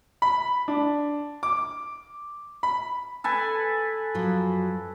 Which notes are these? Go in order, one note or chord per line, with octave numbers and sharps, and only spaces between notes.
B5
D4
D6
B5
A4 B4 G#5
F#2 F3 F#3